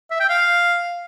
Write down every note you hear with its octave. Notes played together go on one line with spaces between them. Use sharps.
E5
G5
F5